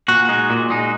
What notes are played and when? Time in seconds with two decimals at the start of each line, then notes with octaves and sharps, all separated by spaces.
0.08 A#2 F#4
0.28 G#3 D#4
0.50 A#2
0.70 G#3 D#4